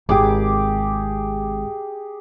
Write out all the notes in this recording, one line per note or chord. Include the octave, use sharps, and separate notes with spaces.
G#1 C3 G4 G#4 D6